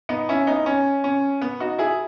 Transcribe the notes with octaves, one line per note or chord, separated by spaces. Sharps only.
B3 D#4
C#4 E4
B3 D#4
C#4
C#4
B3
D#4 F#4
E4 G#4